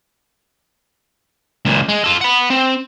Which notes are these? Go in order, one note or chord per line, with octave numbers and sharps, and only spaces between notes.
C#2 A#2
G#3
F4 A4
F#5 B5
C4